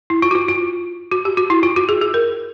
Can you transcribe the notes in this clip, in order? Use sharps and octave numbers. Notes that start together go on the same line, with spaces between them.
E4
F4
F#4
F4
F4
F#4
G4
F#4
E4
F4
F#4
G#4
G#4
A#4